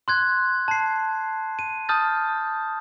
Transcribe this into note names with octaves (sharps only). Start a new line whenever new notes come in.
C6 F#6 G#6
A5 C7
D#7
A5 D#6 F6 G6 A6